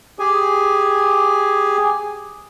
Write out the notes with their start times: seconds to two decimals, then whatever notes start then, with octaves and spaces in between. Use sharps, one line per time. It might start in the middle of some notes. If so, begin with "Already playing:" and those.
0.19 G4 G#4 G#5